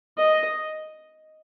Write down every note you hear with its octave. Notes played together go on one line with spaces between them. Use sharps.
D#5